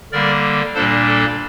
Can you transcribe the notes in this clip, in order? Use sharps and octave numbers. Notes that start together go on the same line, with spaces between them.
D3 G3 A#3 A#4 D5
A#2 G3 A#3 D4 A4 C5
A4